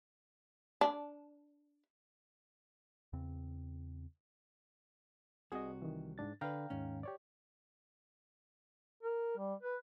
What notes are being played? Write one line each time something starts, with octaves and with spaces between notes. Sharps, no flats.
D4
E2 C#3 C4
C2 C3 F#4 G#4 D#5
D#3 E3
G#2 D4 A6
D3 B4 F5 G5 A#5
D#2 G#2 C#4
G4 C#5 D5
A#4
G3
B4